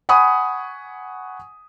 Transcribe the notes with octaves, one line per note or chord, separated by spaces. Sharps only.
F#5 G#5 B5 C#6 D#6